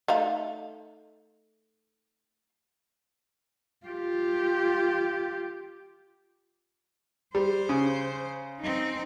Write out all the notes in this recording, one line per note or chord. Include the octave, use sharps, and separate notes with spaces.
A3 D#4 F5
F4 G4
G3 C5
C#3
C4 D#4